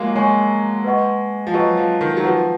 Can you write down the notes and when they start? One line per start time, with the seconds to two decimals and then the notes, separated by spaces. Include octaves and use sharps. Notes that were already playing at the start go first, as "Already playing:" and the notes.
Already playing: F3 F#3 G#3 A#3
0.16 G#3 C#5 G#5 C#6
0.84 B4 D#5 F#5 C#6
1.47 F3
1.54 F#3 B4 D#5 F#5 C#6
1.77 F3
2.01 D#3
2.17 F#3
2.24 F3 F#4 B4 F#5